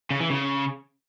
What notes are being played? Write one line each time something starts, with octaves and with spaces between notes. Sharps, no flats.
C#3
E3
C#3